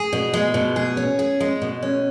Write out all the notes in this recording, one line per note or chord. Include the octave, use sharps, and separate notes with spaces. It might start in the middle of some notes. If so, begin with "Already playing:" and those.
Already playing: G#4
B2
G#3
B2
G#4
C#4
G#4
G#3
B2
C#4